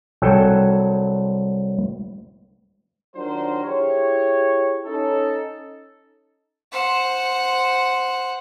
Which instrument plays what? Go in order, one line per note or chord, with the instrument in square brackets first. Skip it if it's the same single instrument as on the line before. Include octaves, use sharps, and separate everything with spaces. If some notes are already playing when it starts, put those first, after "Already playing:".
[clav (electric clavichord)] C2 F#3 A4 G5 G#5
[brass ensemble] D#3 F#3 D4 F4 A#4 C5
E4 G4 G#4 C#5
C#4 D#4 A4
[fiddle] C5 F#5